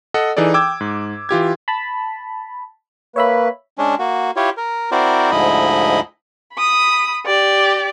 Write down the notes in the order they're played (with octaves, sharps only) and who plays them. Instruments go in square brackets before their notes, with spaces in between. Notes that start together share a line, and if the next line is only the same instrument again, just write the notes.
[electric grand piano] A4 D#5 F#5
E3 D#4 G#4 A4 D5
G5 D6 E6 G#6
G#2
E3 F4 G4 G#6
[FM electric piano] A5 B5
[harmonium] A#3 B4 [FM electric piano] C#5 E5 B5
[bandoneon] G#3 C#4 D4
A#3 F#4
E4 F4 G4 C#5
A#4
C4 E4 F#4 A#4 C5 D5
D2 G#2 F3 E4 D#5 B5
[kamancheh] B5 D#6
G4 D5